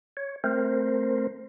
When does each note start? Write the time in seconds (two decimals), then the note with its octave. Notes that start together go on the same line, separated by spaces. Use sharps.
0.17 C#5
0.44 A3 C4 A#4 C5